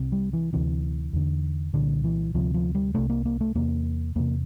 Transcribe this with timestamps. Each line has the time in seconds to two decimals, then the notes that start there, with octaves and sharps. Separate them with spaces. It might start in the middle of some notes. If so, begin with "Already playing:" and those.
Already playing: C2 C3
0.12 G3
0.33 E3
0.53 D2 C3 E3
1.13 E2 D3
1.74 C2 A#2 D3
2.04 E3
2.34 D2 C3 F3
2.54 F3
2.75 G3
2.94 C2 C3 A3
3.10 A#3
3.25 A#3
3.41 A3
3.55 E2 C3 A#3
4.15 E2 C3 A#3